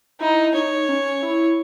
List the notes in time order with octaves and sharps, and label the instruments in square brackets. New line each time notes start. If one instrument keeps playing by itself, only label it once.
[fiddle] D#4 [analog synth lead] E4
[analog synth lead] D#4 [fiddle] C#5
[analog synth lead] C#4
E4